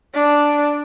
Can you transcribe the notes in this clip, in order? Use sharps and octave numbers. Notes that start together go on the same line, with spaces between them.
D4